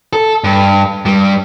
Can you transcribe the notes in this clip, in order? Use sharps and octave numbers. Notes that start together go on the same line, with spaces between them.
A4
G2
G2 G3